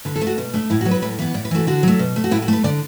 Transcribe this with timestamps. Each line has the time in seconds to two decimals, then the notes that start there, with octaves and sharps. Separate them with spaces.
0.05 D3 B4
0.16 A4
0.21 A3
0.27 F#4
0.38 B2
0.54 A3 D4
0.70 A2 E4
0.81 F#4
0.86 F#3 B3
0.91 B4
1.02 A2 B4
1.19 E3 B3 B4
1.34 A2 D5
1.45 B4
1.51 E3 A3 F#4
1.67 D3 F#4
1.83 F#3 A3
1.99 B2
2.16 A3
2.24 F#4
2.31 A2 E4
2.42 F#4
2.48 A3 B4
2.64 D3 D5